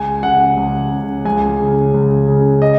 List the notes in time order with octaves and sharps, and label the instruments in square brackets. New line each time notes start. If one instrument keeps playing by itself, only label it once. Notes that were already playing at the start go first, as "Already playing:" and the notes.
Already playing: [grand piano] C#2 G#5
C#3 F#5
C#2
C#3
C#2 G#5
C#3
C#2
C#3
D#5